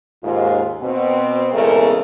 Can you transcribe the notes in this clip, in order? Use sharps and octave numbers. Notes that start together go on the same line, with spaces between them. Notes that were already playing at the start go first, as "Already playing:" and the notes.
D#2 G#2 F4
B2 C4
E2 C#3 G#3 A3 C4 A#4